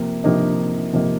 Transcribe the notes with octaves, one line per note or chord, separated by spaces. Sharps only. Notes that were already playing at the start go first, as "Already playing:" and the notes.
Already playing: C3 F3 A#3
C3 F3 A#3 D#4
C3 F3 A#3 D#4